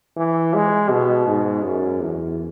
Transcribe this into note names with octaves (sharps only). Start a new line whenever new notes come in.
E3
G#3
B2
G#2
F#2
E2